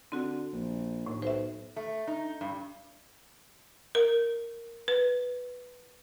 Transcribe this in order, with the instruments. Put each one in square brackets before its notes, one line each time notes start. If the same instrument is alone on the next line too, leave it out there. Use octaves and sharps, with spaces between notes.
[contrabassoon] D3 [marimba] C4 F#4
[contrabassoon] A#1
[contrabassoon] D#2 [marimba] A2
[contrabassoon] B1 [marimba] C5 E5
[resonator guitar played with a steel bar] A3
D#4
G2
[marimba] A#4
B4